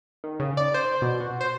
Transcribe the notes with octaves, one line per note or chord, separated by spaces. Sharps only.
D#3
C#3
D5
C5
B2
F#4
C5